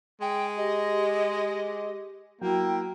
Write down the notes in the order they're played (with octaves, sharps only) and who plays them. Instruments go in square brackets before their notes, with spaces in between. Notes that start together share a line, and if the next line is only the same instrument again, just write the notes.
[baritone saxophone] G#3 [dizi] G5
[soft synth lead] G4 [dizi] D#5
[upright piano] F#3 [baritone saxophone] A#3 [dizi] E4 [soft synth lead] G5